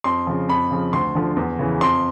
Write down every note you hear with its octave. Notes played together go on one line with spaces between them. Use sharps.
F2 C6
C#3 F3
F2 B5
C#3 F3
D2 C6
D3 F3
E2
C#3 E3
F2 C6